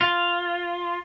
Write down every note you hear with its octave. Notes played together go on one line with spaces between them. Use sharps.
F4